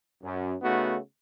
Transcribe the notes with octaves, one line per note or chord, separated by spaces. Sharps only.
F#2
C#3 A3 B3 D#4 F#4